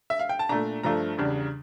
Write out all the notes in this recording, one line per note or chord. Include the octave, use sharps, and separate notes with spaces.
E5
F5
G5
A5
A#2 A3 D4 A#5
G2 F3 A3 D4 A#5
E2 C#3 G3 D4